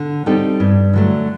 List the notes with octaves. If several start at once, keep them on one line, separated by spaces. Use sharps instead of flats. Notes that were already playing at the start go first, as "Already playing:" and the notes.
Already playing: D3
G3 C4 D#4 A4
G2
D3 F#3 A3